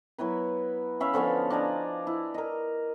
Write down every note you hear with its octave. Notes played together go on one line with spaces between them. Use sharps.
F#3 B3 E4 B4
C#4 E5 F5 B5
D3 F3 B3 C#4
D4 D#5 G#5 A#5
E4
A#4 D#5